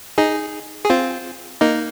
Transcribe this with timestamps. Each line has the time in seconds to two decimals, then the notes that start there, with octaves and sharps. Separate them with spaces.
0.18 D#4 G#4
0.85 G#4
0.90 C4 F4
1.61 A#3 D#4